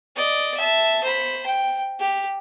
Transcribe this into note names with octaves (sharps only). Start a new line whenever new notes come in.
D5 D#5
E5 A5
C5 B5
G5
G4